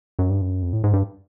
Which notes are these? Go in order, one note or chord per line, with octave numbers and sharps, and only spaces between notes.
F#2
G2
F#2
F2
A2
G#2
G2